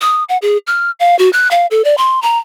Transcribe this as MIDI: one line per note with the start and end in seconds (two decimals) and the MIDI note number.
0.01 0.24 87
0.29 0.37 78
0.42 0.58 68
0.67 0.91 89
1.00 1.17 77
1.19 1.30 66
1.33 1.48 90
1.51 1.66 77
1.71 1.84 69
1.85 1.95 74
1.98 2.22 84
2.22 2.39 82